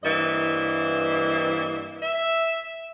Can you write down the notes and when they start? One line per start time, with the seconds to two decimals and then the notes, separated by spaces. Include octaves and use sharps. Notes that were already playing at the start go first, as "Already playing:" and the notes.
0.04 G2 E3 A#3 C4 D#5 E5
2.02 E5